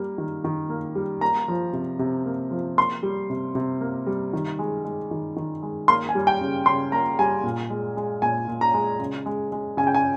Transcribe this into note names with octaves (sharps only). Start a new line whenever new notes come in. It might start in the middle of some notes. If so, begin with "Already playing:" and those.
Already playing: G3 A#3
D#3
D#3
A#3
G3
A#3 A#5
F3
C3
C3
A#3
F3
A#3 C6
G3
C3
C3
A#3
G3
D#3
G#3
G#3
D#3
D#3
G#3
A#3 C6
G#5
G3
G5
C#3
C#3 C6
A#3 A#5
G3 G#5
A#2
G#3
G#3
A#2 G#5
A#2
A#5
G#3
C#3
G#3
G#3
C#3 G#5
G5
G#5